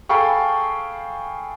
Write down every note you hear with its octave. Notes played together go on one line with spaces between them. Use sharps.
G#4 A4 F5 G5 B5 C#6